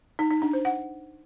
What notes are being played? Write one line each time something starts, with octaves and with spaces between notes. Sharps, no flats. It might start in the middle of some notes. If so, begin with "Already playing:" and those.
D#4
D#4
D4
C5
F#5